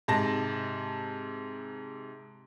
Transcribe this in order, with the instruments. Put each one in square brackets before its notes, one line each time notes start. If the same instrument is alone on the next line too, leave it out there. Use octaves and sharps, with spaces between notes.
[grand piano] G#2 C3 A5 A#6